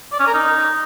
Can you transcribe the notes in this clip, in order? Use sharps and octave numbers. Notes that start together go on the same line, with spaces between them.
D5
C#4
A#4
D#4